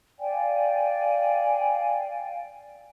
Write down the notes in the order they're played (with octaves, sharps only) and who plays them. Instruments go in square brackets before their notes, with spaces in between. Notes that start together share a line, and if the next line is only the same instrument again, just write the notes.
[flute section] D5 F5 G5 G#5